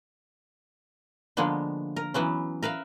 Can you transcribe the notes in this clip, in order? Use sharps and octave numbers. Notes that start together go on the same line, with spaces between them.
D3 F3 G#3 A#3 B3
A#4
E3 F#3 B3 C#4
A#4 B4 E5 F5